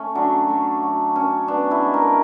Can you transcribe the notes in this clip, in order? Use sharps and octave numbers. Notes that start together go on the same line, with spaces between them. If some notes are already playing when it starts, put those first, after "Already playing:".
Already playing: A3 C#4
F#3 D4
A3
F#3
C#4
B3 D4
E4
G#3
A#4